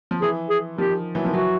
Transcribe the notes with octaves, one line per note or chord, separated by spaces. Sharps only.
F3
E3 G#4
G#4
D#3 F3 G4
E3 F#3
D#3 F3
E3 F#3 F#4